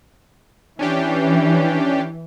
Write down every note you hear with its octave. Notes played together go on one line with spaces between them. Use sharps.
E3 C#4 D4 G4